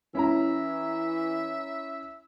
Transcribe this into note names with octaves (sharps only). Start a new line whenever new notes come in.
E3 C#4 E4 E5 A#5